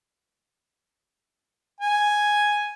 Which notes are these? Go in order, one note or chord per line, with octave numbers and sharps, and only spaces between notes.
G#5